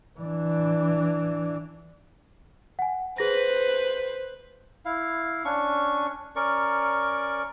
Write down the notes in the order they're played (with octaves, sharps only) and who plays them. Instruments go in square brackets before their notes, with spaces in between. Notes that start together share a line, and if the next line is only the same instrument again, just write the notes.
[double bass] E3 D4
[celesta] F#5 G#5
[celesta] G#4 A#6 [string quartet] B4 C5
[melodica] E4 F5
C#4 D4 C#6
C#4 A#4 D5 C#6